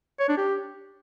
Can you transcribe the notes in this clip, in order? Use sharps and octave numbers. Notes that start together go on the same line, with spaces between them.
C#5
D4
G4